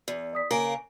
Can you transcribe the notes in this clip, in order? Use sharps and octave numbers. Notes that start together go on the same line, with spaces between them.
E2
D5 D#6 B6
C#3 A#3 A#4 G#5 D7